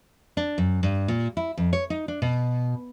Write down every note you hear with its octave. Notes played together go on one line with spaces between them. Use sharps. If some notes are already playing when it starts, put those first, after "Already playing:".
D4
F#2
G2
A#2
E4
F2
C#5
D#4
D4
B2